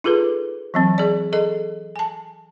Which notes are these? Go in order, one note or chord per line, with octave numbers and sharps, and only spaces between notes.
D#4 F4 G#4 A4 B4
E3 F#3 C4
G#4 D5
G#4 A4 D#5
G#5 A5